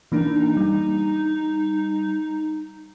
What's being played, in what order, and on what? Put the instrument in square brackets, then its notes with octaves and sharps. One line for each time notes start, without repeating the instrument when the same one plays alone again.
[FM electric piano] E3 A#3 D4 [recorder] D#4
[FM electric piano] G3